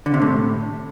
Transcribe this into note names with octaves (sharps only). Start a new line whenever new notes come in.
D3
C3
A2